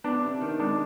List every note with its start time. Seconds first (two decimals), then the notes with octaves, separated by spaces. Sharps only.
0.04 B3 D4
0.23 C3
0.41 D#3
0.60 G#3 D4